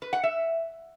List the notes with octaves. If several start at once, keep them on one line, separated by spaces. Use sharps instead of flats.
B4
F#5
E5